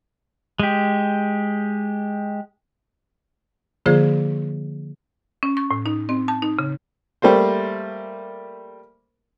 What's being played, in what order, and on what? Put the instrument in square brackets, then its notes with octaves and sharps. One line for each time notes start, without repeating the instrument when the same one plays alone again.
[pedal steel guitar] G#3 G4
[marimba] D3 F3 A#3 F4 G#4 C5
C#4
C#6
A2
D#4
C4
A5
D#4
C#3
[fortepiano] G3 A3 A#3 C5